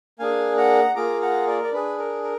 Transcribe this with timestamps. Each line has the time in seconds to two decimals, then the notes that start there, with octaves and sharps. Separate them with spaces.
0.19 A#3 D4 G#4 F5 G#5
0.57 F#5 A#5
0.95 A#3 F4 G#4 A#5 D6
1.22 F#5 A#5
1.47 A#4 D5
1.64 D5
1.72 D4 G#4 B4
1.98 A#4
2.23 A#4